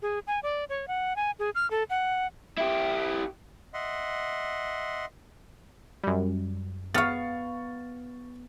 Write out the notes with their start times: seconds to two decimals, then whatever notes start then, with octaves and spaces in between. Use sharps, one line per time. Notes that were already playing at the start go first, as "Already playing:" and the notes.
0.02 G#4
0.27 G#5
0.43 D5
0.69 C#5
0.88 F#5
1.16 G#5
1.39 G#4
1.55 F6
1.71 A4
1.90 F#5
2.58 E4 G4
3.74 D#5 E5 F#5 C6
6.04 F#2 G3
6.94 B3 F5 C#6 F6 A6